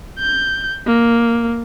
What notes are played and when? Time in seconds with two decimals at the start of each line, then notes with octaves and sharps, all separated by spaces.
0.19 G6
0.87 A#3